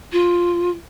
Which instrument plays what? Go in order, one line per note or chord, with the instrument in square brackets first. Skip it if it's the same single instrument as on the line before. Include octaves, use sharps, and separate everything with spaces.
[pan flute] F4